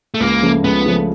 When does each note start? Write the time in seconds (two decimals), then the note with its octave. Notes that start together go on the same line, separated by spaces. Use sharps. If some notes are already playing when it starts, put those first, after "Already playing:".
0.14 A3
0.20 C#2 A#3
0.42 C#3 F3 A3
0.64 C#2 B3
0.86 C#3 F3 A3